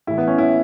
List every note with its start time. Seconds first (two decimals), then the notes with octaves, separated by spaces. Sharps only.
0.07 A2 E3 E4
0.18 B3
0.27 C#4
0.38 E4